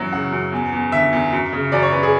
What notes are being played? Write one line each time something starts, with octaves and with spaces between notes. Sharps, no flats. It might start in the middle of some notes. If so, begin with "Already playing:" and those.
Already playing: F#2 E3 F#3
C#3 F#5
F#2
E2
E2
D3 E5
E2
F#2
C#3
F#2 D5
C#5
F#2 B4
G#4